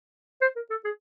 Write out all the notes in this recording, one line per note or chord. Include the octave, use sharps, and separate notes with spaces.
C5
A#4
A4
G#4